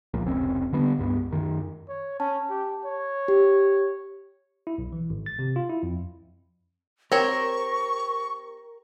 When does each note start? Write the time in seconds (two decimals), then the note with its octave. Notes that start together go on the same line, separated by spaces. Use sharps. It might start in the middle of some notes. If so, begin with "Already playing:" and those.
0.14 C#2 A#2 F3 A#3
0.26 F1 C#2 C4 C#4
0.72 D3 G3 B3 D4
0.98 C#2 G2 B3
1.31 F#2 D#3
1.88 C#5
2.20 C#4 A5
2.49 G4
2.85 C#5
3.28 G4
4.67 E4
4.78 B1
4.93 E3
5.10 G#1
5.26 A6
5.39 C3
5.56 F4
5.70 E4
5.83 F2
7.12 C4 G4 A#4 C#5 C#6